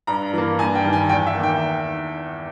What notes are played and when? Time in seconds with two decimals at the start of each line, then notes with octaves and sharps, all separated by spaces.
0.07 G2 A#5
0.33 E3 A#3
0.59 G2 G#5
0.75 G5
0.84 D#3 G3
0.93 G#5
1.09 E2 G5
1.26 E5
1.35 A#3
1.40 D#3 G5